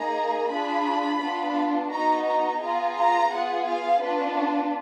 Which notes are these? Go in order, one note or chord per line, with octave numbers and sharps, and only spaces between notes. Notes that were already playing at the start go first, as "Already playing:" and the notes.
Already playing: A#3 D#4 G#4 A#5
D4 F4 G#4 B5
B3 D4 F4
B3 D#4 F#4 A#5
A#5
B3 F4 G#4 A#5
A#5
B3 F4 G#4 F#5
F5
B3 D4 F4 B4
B4